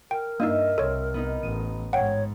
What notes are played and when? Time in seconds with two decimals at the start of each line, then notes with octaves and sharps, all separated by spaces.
0.11 A#4 G5
0.40 G2 A#3 D4 D#4 D#5 E5
0.78 C2 C4 A4 C#5
1.14 B3 D#4
1.43 A1 D#7
1.93 G#2 C#5 F#5 G5